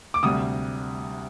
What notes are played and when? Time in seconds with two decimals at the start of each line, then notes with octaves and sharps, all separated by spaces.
0.14 D6
0.23 D2 C3 G3 D#6